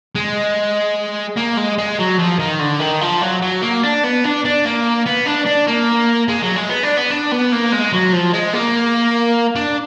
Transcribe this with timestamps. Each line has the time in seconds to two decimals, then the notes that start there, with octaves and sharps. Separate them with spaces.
0.15 G#3
1.37 A#3
1.57 G#3
1.78 G#3
1.99 F#3
2.19 F3
2.39 D#3
2.60 D3
2.80 D#3
3.01 F3
3.21 F#3
3.42 F#3
3.62 A#3
3.84 D4
4.04 B3
4.24 D4
4.45 D4
4.65 A#3
5.06 B3
5.27 D4
5.46 D4
5.67 A#3
6.28 G#3
6.42 F#3
6.56 G#3
6.69 B3
6.83 D4
6.97 B3
7.10 D4
7.32 B3
7.52 A#3
7.72 G#3
7.93 F#3
8.13 F3
8.33 G#3
8.53 A#3
9.56 D4